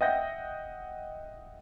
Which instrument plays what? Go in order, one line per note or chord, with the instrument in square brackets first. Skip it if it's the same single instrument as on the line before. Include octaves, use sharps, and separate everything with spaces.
[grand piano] D#5 E5 F#5 G5 G6 A#6